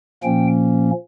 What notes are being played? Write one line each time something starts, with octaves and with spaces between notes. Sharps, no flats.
A#2 F3 A#3 C#4 G5